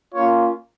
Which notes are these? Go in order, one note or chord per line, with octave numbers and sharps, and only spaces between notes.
A#3 C#4 F4 C#5